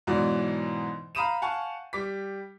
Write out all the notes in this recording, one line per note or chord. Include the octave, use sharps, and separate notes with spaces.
G#2 B2 E3 F#3 D5
F5 A#5 B5 D#6 D#7 E7
F5 F#5 G#5 A5 C#6
G3 D6 B6